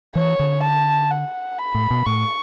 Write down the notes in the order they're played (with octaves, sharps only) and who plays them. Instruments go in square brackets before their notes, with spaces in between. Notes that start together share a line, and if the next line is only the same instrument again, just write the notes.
[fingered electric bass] E3 [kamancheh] C#5
[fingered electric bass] D3
[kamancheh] A5
F#5
B5
[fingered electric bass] A2
B2
[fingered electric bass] A2 [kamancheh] C#6